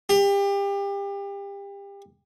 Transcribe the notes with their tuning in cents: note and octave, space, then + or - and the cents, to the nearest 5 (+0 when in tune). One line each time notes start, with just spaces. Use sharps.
G4 +30